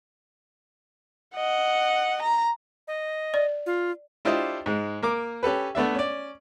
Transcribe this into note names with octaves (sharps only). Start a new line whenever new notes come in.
D#5 F#5
A#5
D#5
D5
F4
D4 E4 F4 G4 C5 D#5
G#2 G#3
A#3 A#4 D6
C#4 G4 A4 B4
A3 B3 D4 E5
C#4 D5